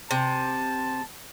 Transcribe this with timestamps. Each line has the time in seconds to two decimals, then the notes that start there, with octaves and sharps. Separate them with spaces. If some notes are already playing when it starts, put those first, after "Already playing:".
0.11 C3 A5